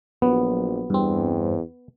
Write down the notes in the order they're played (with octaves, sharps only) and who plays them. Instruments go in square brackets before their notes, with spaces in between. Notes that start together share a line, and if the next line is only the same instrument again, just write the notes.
[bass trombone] A#1 [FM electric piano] F#3 [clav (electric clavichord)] B3
[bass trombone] E2 [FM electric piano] G2 C4